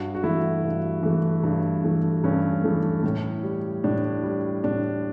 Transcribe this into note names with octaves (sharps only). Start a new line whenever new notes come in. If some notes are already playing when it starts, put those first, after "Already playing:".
Already playing: G2 F#4
F#4
E3 A3 E4
G2
E3 A3
G2
E3 A3
G2 C#4
E3 A3
A2
G3
A2 D4
G3
A2 D4